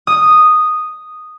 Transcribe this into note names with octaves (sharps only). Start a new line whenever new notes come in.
D#6